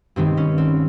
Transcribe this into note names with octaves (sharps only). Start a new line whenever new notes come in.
G2 D#3 G#3 B3 C4
C#4
C4